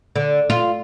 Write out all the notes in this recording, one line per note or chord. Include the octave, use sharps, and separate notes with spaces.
D3
F4